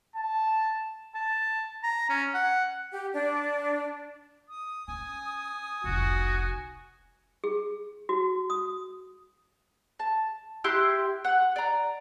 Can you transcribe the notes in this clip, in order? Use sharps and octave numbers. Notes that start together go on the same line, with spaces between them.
A5
A5
A#5
C#4
F#5
G4
D4
D#6
C#4 G#5
F1 C2 F#4
G#4
F#4
D#6
A5
E4 G4 C6 F#6
F#5
D5 A#5